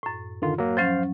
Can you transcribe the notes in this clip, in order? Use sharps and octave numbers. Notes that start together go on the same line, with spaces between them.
F#2 A2
D3 D#3 F4
F#3 A#3
F3 F#3 C#4 C5 F5